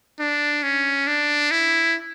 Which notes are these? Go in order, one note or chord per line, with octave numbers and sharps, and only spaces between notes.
D4
C#4
D4
E4